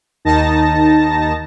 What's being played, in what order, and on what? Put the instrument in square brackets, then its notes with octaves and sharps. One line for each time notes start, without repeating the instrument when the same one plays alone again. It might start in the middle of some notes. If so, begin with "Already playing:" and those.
[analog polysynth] D#2 D#3 D#4 A5 A#6